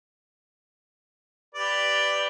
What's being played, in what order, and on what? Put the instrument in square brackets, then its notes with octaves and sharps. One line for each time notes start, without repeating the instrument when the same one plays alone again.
[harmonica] G4 B4 D5